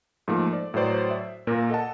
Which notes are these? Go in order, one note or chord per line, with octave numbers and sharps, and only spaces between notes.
G#2 F3 A3 A#3
D5
A2 F#3 B4 C5 D5
E5
A#2 A#3 A#4
A4 D#5 F#5 A5